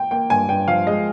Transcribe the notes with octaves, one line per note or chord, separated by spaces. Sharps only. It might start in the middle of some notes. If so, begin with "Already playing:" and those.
Already playing: G5
A#3 G5
G2 G#5
G2 G5
F3 F5
G#3 D#5